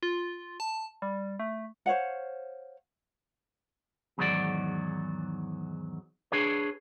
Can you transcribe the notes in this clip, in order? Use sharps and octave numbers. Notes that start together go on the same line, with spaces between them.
F4
A5
G3
A3
C5 C#5 F5 F#5
E2 G#2 D#3 F#3 F#4 D5
D4 G#4 B4 C#5